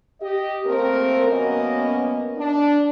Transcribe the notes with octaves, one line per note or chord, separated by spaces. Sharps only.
G4 D#5
A3 A#3 C4 A#4
F#2 B2 A#3 B3 C#4 D#5
D4